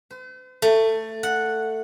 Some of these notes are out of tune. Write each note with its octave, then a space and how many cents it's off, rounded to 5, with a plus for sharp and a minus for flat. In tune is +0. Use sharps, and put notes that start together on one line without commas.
C5 -45
A3 +15
F#5 -5